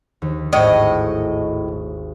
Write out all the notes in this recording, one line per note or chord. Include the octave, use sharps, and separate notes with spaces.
D#2
G#1 A2 D#5 C#6